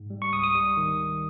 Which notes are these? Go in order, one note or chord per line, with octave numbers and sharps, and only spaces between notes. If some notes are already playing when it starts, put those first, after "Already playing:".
Already playing: G#2
G3
C#6
C#2 D#6
D#6
G3 D#6
D#3